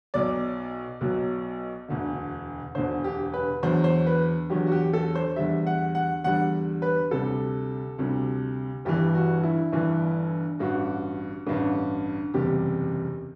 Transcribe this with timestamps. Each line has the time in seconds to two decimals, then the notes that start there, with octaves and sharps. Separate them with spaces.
0.14 B1 B2 F#3 D5
1.01 B1 B2 F#3
1.88 E1 D2 D3
2.75 E1 D2 D3 C5
3.04 G4
3.34 B4
3.62 E2 D3 F#3 C5
3.84 C5
4.06 B4
4.50 E2 D3 F#3 G4
4.67 F#4
4.72 G4
4.93 A4
5.15 C5
5.36 E2 D3 G3 E5
5.66 F#5
5.95 F#5
6.24 E2 D3 G3 F#5
6.82 B4
7.11 D2 C3 G3 A4
7.98 D2 C3 G3
8.85 G1 G2 E3 G4
9.15 F#4
9.43 E4
9.72 G1 G2 E3
10.59 A1 G2 D3 F#4
11.47 A1 G2 D3
12.34 F#1 E2 C3 G3 G4